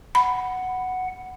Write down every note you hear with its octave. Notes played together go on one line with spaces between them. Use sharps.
F#5 B5